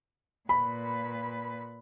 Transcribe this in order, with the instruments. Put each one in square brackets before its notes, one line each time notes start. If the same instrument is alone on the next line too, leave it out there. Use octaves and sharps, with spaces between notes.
[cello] A#2 B4 [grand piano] B5